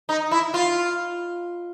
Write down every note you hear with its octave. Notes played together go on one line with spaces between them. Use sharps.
D#4
E4
F4